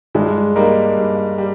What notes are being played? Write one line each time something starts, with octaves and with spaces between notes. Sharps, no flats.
G2 G#3
G3 A#3 D#4 A#4
G2
G3